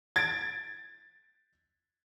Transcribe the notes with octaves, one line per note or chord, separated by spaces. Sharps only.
G#6 A6 D7